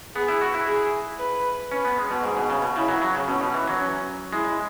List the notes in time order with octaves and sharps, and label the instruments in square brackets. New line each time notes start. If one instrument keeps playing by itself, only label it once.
[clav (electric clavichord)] B3 [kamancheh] G#4
[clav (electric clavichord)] E4
F#4
E4
[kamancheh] G#4
B4
[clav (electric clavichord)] C#4 [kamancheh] B4
[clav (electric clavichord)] B3
G#3
B2
[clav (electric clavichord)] G#2 [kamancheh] G#4
[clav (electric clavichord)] B2
C#3
B2
[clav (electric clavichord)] C#3 [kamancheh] E4
[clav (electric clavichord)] F#3
F#3
C#3
[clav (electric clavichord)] B2 [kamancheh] C#4
[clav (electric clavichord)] B2
E3
F#3
[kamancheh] C#4
[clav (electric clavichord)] G#3 [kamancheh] E4